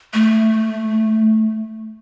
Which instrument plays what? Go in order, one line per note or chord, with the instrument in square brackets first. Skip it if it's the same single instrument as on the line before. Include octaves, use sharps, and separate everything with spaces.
[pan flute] A3